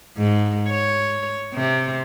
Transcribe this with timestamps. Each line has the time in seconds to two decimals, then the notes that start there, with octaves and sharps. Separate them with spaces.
0.18 G#2
0.69 C#5
1.54 C3